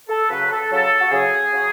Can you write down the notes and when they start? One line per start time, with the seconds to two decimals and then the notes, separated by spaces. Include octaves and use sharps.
0.09 A4
0.30 C#3 F#3 B4
0.50 A4
0.70 C#3 F#3 A4
1.00 F#4
1.11 C#3 F#3 G#4
1.52 C#3 F#3